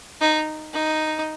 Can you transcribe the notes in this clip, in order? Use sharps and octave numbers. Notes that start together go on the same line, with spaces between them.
D#4
D#4